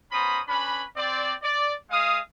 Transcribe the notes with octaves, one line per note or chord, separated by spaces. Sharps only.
B3 C#4 C5 A#5 B5 D#6
C#4 D4 B4 B5
C4 D5
D5
G#3 F5 D#6